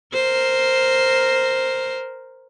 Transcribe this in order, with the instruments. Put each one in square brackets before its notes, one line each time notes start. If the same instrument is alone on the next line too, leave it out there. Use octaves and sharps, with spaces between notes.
[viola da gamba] A#4 C5